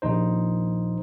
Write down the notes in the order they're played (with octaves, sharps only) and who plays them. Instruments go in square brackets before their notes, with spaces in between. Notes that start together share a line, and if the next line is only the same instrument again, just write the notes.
[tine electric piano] A#1 D#2 D#4 C5